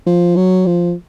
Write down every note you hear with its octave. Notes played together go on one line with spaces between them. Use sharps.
F3
F#3
F3